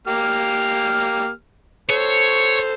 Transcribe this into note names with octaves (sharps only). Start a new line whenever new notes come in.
A#3 G4 F6
A4 C5 C#5